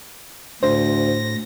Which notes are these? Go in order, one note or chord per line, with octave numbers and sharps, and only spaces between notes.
D2 A2 C5 A#6